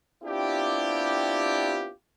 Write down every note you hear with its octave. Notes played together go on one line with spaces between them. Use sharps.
B3 C4 D4 E4 F4 G4